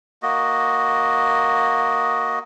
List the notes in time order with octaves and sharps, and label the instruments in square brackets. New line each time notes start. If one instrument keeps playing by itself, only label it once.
[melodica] A#3 F#4 D#5